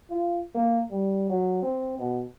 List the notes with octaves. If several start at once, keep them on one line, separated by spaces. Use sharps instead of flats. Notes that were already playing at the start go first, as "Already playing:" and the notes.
F4
A#3
G3
F#3
C4
B2